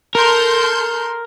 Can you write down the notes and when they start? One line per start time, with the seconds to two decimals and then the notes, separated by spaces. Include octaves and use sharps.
0.15 A4 A#4 C6 G6